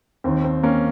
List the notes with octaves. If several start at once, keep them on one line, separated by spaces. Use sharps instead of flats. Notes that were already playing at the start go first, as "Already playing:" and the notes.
D#2 D#3 C4
C4
A#3 C#4